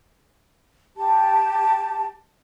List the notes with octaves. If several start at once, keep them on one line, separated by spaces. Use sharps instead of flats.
G4 A5